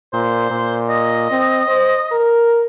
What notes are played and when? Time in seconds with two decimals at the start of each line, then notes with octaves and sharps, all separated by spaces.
0.13 A#2 C5
0.51 A#2
0.89 D#5
1.31 C4
1.68 C5
2.12 A#4